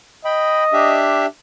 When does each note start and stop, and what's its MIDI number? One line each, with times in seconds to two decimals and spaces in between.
0.25 1.05 75
0.25 0.64 79
0.25 0.64 83
0.73 1.26 62
0.73 1.26 67
0.73 1.26 76